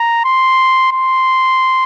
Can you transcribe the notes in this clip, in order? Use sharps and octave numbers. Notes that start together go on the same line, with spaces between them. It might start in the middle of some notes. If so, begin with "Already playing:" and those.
Already playing: A#5
C6
C6